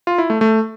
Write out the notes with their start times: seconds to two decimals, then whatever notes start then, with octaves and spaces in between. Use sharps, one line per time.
0.07 F4
0.18 E4
0.30 A3
0.41 A3